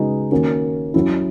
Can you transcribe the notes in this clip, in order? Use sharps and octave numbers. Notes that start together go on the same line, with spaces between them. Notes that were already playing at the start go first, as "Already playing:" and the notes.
Already playing: C#3 G#3 D#4 F#4 B4
D#3 A#3 C#4 F#4
F#3 C#4 E4